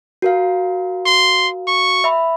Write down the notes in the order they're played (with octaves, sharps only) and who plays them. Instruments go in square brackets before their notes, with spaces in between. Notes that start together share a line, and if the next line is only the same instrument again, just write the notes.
[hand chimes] F#4 A#4 F5
[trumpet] C6
C#6
[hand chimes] E5 B5